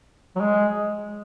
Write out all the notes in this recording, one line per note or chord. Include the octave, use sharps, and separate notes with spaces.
F#3
G#3